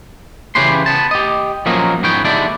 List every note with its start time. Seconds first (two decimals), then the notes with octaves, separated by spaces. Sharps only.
0.55 C#3 E3 C#4 G4 B4 C6
0.86 B3 A5
1.11 G4 D#5
1.66 F3 F#3 A#3 C#4 A#4 D#5
2.03 G#2 B3 C#4 G5
2.25 D#2 D3 G#3 D4 E4 D5